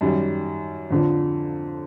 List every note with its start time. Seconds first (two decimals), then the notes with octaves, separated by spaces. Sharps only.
0.01 F#2 D#3 G3
0.90 F2 D3 F3